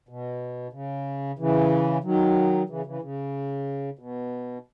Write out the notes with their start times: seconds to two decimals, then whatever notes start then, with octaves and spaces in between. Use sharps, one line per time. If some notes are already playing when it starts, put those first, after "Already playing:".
0.09 B2
0.73 C#3
1.39 C#3 E3
2.04 D#3 F#3
2.69 C#3 E3
2.86 C#3 E3
3.02 C#3
3.99 B2